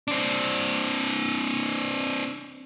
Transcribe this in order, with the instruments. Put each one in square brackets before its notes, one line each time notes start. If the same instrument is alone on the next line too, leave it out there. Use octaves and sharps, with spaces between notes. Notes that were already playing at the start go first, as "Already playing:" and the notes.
[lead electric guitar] C4 D4